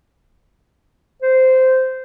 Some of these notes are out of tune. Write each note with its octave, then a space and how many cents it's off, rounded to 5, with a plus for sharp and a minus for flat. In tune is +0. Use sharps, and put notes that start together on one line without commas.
C5 -15